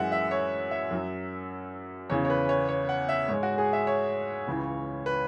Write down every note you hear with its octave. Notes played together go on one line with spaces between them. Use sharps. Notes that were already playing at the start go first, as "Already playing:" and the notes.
Already playing: F#2 E3 G#3 E5 F#5
E5
C#5
E5
F#2 F#3
E2 C#3 E3 C#5
C#5
B4
C#5
C#5
F#5
E5
G#2 G#3 C#5
F#4
G#4
E5
C#5
C#2 C#3 E3
B4